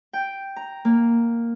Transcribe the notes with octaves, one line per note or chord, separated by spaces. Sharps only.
G5
A#5
A#3